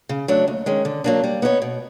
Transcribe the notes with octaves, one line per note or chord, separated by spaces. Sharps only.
C#3
F#3 A3 D4
D#2
D#3 G#3 C#4
D3
F#3 A#3 D4
G3
B3 D#4 G#4 C#5
B2